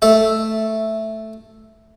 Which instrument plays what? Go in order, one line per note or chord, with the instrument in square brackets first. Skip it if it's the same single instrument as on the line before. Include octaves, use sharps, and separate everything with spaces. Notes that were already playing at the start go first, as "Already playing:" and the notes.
[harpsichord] A3 A4 E5